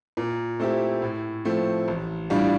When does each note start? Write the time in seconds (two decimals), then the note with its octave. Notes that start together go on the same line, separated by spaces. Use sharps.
0.17 A#2
0.60 A3 C4 E4 G4
1.02 A2
1.45 F3 A3 C4
1.88 A1
2.30 A2 G3 D4 F4